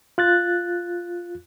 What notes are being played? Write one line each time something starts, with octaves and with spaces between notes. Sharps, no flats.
F4 F#6 A6